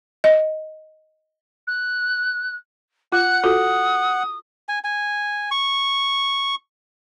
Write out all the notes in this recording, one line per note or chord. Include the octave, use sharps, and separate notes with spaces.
D#5
F#6
F4 F#5 F#6
F4 F#4 A4 D#6
G#5
G#5
C#6